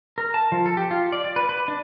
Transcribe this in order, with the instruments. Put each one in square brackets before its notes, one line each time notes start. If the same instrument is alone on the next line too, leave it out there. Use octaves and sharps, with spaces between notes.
[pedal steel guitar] A#4
A5
F3
A4
G4
F4
D5
D5
B4
B4
D4